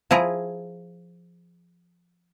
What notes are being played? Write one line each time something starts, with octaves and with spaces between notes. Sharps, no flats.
F3 E4 G#4 A#5